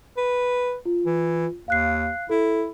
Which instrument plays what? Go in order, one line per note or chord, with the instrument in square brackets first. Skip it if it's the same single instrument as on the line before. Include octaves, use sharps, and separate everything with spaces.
[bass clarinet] B4
[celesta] F4
[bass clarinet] E3
[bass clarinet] D#2 [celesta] F5 F#6 C7
[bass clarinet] E4 [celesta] A4